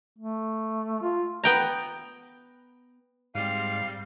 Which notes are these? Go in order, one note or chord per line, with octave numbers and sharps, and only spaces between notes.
A3
F4
B3 G5 A#5
G#2 G3 C4 F5